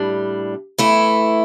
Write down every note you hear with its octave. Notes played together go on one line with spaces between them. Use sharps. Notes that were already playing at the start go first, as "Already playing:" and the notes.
Already playing: A2 G3 D4
E3 A3 E4